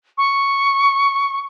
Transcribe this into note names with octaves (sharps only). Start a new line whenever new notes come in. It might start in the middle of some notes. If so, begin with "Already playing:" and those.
C#6